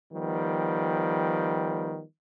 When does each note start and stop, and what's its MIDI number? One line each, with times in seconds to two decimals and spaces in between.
0.13 2.03 51
0.13 2.03 53
0.13 2.03 55
0.13 2.03 59